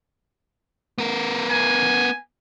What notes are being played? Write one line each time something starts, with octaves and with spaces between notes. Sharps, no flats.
B3 A#4
G#5